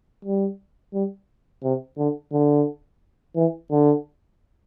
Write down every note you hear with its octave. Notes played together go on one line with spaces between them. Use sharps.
G3
G3
C3
D3
D3
E3
D3